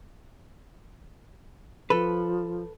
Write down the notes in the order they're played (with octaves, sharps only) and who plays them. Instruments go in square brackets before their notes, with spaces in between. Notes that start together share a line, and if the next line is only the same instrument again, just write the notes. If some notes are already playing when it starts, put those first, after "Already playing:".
[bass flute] F3 [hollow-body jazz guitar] A4 B4